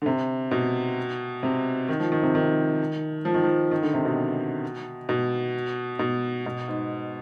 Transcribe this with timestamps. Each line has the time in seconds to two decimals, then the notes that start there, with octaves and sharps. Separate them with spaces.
0.02 D3
0.06 C3
0.51 B2
1.43 C3
1.89 D#3
2.00 F3
2.12 D#3
2.23 C3
2.35 D#3
3.25 F3
3.34 D#3
3.44 F3
3.71 D#3
3.82 D3
3.94 C3
4.05 B2
5.09 B2
5.99 B2
6.46 B2
6.68 G#2